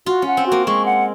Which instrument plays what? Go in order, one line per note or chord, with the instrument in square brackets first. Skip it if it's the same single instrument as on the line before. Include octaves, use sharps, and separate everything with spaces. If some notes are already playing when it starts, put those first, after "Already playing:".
[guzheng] F4 [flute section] F#4
[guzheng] C#4
[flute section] F#5
[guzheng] C4
[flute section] F#4
[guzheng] A#3
[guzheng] G#3 [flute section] C#6
[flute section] F#5